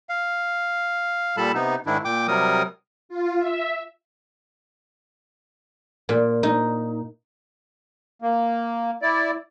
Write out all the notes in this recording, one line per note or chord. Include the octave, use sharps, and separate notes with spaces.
F5
A#2 G3 A4 A5 B5
C3 B3 D#4
G#2 D#3 D4 E4
A#2 G5 D6
C3 F#3 G3 A#4 D#6
F4
E5
A#2
D#4
A#3
E4 D5